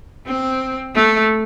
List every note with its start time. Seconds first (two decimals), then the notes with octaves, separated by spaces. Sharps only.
0.26 C4
0.95 A3